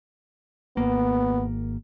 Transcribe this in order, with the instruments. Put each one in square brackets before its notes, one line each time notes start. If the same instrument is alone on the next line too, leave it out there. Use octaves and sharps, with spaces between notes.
[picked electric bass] G#1 A#3 [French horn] B3